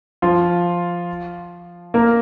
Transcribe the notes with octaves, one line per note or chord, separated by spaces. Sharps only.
F3 F4
A#3 A#4